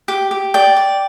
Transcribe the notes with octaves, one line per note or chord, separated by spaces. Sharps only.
G4
G4
D5 G5
D5